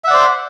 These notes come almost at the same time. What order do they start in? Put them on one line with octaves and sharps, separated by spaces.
E5 F#5 D5 C5